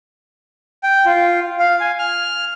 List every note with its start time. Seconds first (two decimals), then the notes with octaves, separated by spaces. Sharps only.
0.83 G5
1.06 F4
1.60 F5
1.80 G#5
1.99 F6